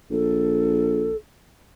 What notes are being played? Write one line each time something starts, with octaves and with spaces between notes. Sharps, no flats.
A#1 A4